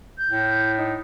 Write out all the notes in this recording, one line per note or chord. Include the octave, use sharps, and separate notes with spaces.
G6
A2
D#4